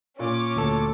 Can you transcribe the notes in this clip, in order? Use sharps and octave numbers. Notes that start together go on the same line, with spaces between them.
A#2 C#4 C#5 D6
D2 A4